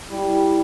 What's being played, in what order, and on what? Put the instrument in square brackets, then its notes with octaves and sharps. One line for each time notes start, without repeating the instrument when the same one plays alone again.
[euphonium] G3 [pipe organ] E4